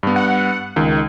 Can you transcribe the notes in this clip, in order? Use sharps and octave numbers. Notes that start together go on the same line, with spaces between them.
G2 B3
F#5
C#2 D#3